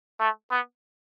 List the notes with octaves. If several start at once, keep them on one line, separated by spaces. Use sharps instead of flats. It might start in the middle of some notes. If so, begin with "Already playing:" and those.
A3
B3